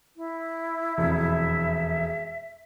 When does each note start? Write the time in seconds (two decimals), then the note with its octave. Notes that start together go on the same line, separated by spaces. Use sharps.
0.17 E4
0.98 E1 F2 E5